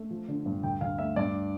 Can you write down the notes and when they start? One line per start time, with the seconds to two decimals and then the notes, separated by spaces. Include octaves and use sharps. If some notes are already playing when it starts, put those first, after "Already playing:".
Already playing: A3
0.11 F3
0.28 D3
0.46 G2
0.63 D2 G5
0.81 D2 F5
0.98 A3 E5
1.16 G2 D5